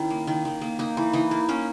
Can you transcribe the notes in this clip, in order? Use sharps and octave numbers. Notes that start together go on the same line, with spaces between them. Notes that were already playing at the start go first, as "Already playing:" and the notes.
Already playing: D#3 C#4 E4
A#3
D#3
D#3
A#3
A#3 D#4
E3
E3 D#4
A#3
A#3 C#4